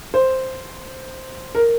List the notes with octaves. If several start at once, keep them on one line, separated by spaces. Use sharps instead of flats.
C5
A#4